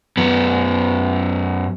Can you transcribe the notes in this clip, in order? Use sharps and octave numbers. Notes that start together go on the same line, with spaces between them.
F#2 B3